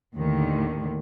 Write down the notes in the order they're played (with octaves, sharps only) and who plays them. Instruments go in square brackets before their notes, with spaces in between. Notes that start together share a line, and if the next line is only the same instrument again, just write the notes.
[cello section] D#2 A2 D3 D#3